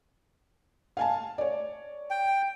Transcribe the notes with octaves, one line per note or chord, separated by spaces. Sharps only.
F5 G#5 A5
C#5 D5
G5